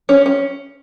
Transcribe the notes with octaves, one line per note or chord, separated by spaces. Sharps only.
C#4
C#4